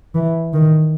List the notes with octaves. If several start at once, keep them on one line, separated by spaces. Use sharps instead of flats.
E3
D#3